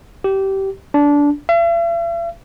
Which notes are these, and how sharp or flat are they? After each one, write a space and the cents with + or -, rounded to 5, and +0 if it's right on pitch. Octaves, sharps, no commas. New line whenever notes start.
G4 -20
D4 -20
E5 +45